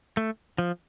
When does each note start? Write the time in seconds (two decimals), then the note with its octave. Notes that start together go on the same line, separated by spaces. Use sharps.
0.17 A3
0.58 F3